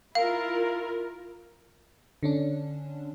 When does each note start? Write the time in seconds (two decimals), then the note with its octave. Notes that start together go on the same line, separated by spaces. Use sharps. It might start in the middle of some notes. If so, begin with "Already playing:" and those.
0.15 E4 F4 A#4 F5
2.23 D3 C#4 D4